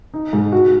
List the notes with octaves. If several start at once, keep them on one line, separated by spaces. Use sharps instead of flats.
D#4
G#2
F#4